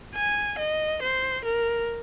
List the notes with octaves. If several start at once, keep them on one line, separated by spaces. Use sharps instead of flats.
G#5
D#5
C5
A#4